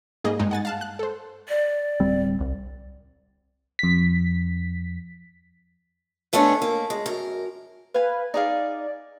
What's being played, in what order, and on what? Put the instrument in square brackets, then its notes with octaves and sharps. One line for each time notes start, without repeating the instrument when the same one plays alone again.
[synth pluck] G#2 G3 A#3 G#4 D#5
G2 G#3 D#4
F#5 G#5 A6
F5 A5 F#6
F#6
A4 C5
[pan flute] D5
[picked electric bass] D1 G3 C4
C2
[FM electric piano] F2 B6
[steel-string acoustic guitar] G#2 A3 B3 C#4 D4
A#3
G#3
F#2 A#4
[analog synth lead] B4 [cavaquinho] F5 G#5
[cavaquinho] D#4 G#4 F5 [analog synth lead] D5